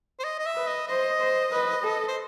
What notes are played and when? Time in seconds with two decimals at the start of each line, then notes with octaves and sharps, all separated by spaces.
0.19 C5
0.24 D#5
0.39 D#5
0.46 E5
0.56 B4
0.67 D#5
0.88 C5 D#5
1.20 C5
1.52 B4
1.84 A4
2.08 C5